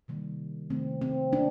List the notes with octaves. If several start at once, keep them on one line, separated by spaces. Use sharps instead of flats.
C3 D#3 G3 A#3
C3 D#3 A3 C4
C4
A#3 D4